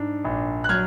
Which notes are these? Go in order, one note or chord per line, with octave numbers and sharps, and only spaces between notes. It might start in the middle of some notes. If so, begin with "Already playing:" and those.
Already playing: G#2 D4
A#1
F#6
F#3 F6 G#6